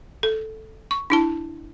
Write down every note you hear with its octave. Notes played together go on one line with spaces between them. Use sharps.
A4
C#6
D4 E4 A5